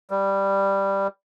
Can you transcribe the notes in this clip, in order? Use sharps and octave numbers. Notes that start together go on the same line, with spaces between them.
G3